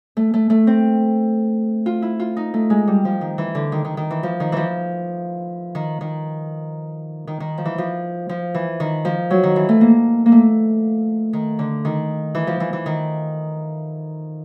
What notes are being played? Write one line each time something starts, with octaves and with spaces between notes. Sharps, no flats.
A3
A3
A3
C4
F4
E4
F4
D#4
A3
G#3
G3
F3
D#3
E3
D3
D#3
D#3
D#3
E3
F3
D#3
E3 F3
D#3
D#3
D#3
D#3
F3
E3
F3
F3
E3
D#3
F3
F#3
D#3
E3
A3
A#3
A#3
A3
D#3
D3
D#3
E3
F3
E3
E3
D#3